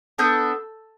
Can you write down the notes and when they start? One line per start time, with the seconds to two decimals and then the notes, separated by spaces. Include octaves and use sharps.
0.18 B3 D4 A4 E6 G6